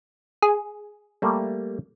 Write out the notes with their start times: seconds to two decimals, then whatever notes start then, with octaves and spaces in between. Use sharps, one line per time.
0.42 G#4
1.22 G3 A3 A#3